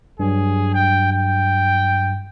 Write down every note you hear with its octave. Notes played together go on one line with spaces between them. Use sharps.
G2 F#3 G#4
G5
G5